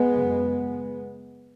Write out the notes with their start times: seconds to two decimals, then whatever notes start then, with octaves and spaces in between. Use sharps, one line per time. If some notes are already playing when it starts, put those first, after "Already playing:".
Already playing: G#3 B3
0.14 F#2 C#3